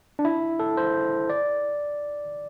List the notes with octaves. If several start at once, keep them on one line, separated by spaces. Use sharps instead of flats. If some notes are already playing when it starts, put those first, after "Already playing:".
D4
E4
A4
C5
D5